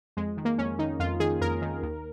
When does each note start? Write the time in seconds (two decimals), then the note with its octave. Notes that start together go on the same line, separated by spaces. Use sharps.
0.17 F2 G#3
0.37 D#3
0.45 A#3
0.58 F2 C#4
0.79 D#3 D#4
1.00 F2 F4
1.20 D#3 G#4
1.41 F2 A#4
1.62 D#3
1.83 D#2